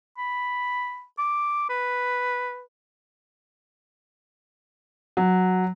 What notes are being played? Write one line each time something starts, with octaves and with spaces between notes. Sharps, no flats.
B5
D6
B4
F#3